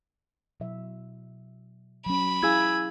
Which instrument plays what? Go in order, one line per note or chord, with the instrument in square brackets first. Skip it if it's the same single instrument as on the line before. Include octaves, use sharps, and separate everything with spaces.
[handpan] B2 F#3 E5
[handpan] F#3 C#4 [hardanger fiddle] B5
[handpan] E4 G#4 F5 [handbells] G#5 E6 G#6